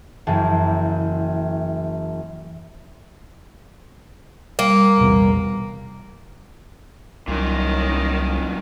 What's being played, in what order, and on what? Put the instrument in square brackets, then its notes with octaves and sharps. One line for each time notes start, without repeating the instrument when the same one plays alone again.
[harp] F#1 F#2 E3 A5
[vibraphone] G3 [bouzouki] A#3
[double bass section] A#1 E2 C3
[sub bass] C2 [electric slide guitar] F#2 A#2 [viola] D#3 D#4